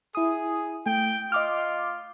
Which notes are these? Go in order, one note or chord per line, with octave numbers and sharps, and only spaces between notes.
E4 G#4 D#6
A3 G5
F4 D#5 D6 F6